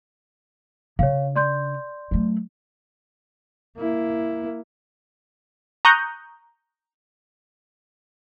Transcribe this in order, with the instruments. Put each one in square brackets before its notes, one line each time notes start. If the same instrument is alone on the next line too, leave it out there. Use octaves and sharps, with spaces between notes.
[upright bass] C#3 D4 [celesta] C#5 F5
[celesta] D5 C6 G6
[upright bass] F#3 A3
[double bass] A#3 E4
[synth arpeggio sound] A#5 C#6 D#6 F#6 G6